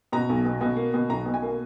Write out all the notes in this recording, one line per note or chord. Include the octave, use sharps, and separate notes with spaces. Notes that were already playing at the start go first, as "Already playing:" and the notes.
B2 A#5
B1
B2
B2
A#3
B2
B1 A#5
B2
G#5
A#3